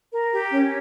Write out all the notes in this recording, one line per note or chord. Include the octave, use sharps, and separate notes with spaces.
A#4
G4
C#4